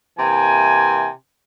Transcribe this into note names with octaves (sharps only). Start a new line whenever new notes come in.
C3 E3 A#3 G#5